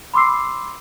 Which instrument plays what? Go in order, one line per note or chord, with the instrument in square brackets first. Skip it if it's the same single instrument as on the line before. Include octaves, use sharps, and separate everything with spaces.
[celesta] B5 C6 D6 E6 C7